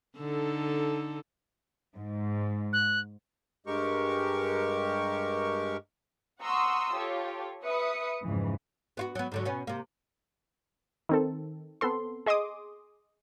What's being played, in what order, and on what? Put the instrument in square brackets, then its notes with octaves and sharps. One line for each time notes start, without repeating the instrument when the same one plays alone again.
[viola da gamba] D3 D#4 A4
[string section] G#2
[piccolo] F#6
[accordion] G2 G#3 G4 A#4 C#6
[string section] F#5 A#5 C6 C#6 D#6 E6
F4 G4 A4 C#5
B4 E5 D#6 C#7
F2 G#2 C#3 E3
[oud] B3 F4 F#4
F#3 B3
G#2 D3 F#3
B2 B3 C#4
C3 A#3
[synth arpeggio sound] D#3 C4 A4
B3 C4 A4 C6
G#4 D#5 C6 D6 D#6